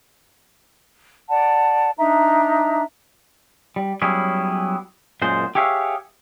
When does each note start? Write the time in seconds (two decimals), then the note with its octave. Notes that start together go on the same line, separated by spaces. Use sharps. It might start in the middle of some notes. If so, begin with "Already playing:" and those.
1.29 D5 F#5 A5
1.98 D4 D#4 E5 A#5
3.76 G3
4.02 F#3 G3 B3 C#4 E4 G#4
5.22 F#2 A#2 G#3 C5
5.55 G4 G#4 C#5 E5 F5